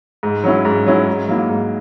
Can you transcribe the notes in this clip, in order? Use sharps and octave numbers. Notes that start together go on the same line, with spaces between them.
G#2
F#3 C#4 E4
G#2
F#3 C#4 E4
G#2
F#3 A#3 E4
G#2